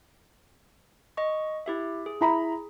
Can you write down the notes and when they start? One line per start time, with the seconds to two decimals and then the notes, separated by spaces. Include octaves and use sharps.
1.17 D#5 C#6
1.66 E4 G4 E5
2.06 G#4
2.21 E4 A#5 B5